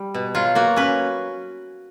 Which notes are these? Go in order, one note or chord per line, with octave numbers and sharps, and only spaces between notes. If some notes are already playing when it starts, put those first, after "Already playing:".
Already playing: G3
B2
F#3 F4
A#3 F#4
C#4 B4